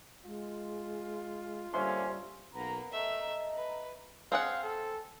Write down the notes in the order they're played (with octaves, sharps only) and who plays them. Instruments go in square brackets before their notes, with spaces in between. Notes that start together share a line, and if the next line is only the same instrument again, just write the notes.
[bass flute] G#3 [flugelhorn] F4
[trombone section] D3 A#3 C#4 [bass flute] G3 [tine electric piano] C5 E5 C6
[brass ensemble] B1 C#4 A#5 [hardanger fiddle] A#3 B3
[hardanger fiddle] A3 E5 [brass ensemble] D#5 A5 A#5
[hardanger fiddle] B4
[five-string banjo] C4 G#4 F#5 [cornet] F5
[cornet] A4